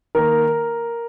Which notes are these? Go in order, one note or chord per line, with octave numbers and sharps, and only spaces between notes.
D#3 A#3 A#4